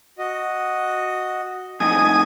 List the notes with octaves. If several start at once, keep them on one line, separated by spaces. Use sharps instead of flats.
F#4 D#5
F2 A2 D#4 G#5 D#6